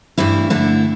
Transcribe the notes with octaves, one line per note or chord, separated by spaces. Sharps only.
G2 E3 A3 E4
D3 A3 E4